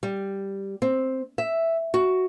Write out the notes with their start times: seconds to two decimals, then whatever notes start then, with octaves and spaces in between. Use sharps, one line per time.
0.03 G3
0.82 C4
1.38 E5
1.94 F#4